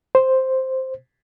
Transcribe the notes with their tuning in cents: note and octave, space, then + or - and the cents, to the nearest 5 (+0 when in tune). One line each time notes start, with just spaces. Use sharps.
C5 +0